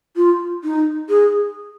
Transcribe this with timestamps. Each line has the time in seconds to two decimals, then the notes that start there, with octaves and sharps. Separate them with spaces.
0.16 F4
0.64 D#4
1.10 G#4